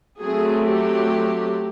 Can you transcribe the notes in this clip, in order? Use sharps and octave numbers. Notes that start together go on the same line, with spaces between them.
F#3 A3 C4 G#4
G4